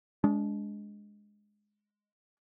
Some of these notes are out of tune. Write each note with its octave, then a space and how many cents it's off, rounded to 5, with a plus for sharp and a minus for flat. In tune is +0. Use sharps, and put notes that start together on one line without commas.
G#3 +0 D4 -30